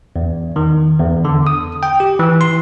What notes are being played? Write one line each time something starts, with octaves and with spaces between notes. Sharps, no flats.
E2
D#3
E2
D3
D#6
G5
G4
E3
C6